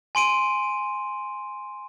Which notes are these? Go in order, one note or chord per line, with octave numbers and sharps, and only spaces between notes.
G#5 C6 D7 D#7